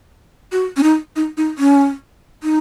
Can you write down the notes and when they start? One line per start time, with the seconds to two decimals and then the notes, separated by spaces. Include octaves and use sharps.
0.52 F#4
0.77 C#4
0.83 D#4
1.16 D#4
1.37 D#4
1.58 C#4
2.43 D#4